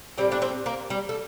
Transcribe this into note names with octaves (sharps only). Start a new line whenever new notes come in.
A2 G3 C4 D5
D4 D5
C4 C5
A#3 A#4
G3 G4
A4